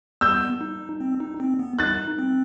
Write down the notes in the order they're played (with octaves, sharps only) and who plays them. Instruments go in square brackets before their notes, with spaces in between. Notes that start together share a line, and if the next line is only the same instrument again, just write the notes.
[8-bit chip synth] B3 [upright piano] E6 G6
[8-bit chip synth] D#4
C4
D#4
C4
B3
[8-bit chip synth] D#4 [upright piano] F#6 A6
[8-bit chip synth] C4